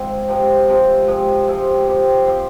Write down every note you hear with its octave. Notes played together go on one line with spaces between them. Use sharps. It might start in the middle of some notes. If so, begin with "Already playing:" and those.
Already playing: G#2 F3 C4
C3 F3 G#3 C4
C3 F3 G#3 C4
C3 F3 G#3 C4
C3 F3 G#3 C4
F3 C4 G4 C5
F3 C4 G4 C5